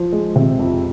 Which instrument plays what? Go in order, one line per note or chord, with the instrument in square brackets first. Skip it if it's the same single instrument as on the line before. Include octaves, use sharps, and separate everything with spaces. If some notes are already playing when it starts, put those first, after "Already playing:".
Already playing: [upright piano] F3
G#3
C3
F2